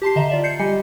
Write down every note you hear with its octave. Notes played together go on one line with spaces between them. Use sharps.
G4 A5 C6 C7
D3 D#5 E5 A#5 E7
F4 D5 E5
G6 C7 C#7
G3 G4 D#5 G#5 C#7